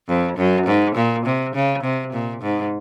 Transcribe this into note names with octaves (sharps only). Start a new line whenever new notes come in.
F2
F#2
G#2
A#2
C3
C#3
C3
A#2
G#2